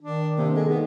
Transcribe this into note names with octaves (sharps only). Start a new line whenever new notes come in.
D#3 D4
C3 A#3
G#3 A4
B3 D#4